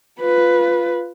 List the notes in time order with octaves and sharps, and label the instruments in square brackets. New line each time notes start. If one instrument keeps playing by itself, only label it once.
[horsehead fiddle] F4 B4